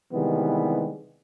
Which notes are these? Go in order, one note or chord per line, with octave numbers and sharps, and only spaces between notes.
C3 D#3 E3 G3 G#3 B3